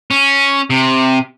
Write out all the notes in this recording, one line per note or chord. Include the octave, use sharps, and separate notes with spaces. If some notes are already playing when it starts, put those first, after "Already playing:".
C#4
C3